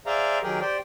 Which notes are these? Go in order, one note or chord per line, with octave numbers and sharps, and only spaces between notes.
G#4 C5 D5 E5 F5 A#5
D#3 F#3 G4 G#4 A#4
G4 C5 D5